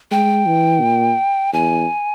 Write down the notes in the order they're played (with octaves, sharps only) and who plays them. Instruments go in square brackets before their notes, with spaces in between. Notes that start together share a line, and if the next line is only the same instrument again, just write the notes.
[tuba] G#3 [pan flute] G5
[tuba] E3
A#2
[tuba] E2 [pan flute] G#5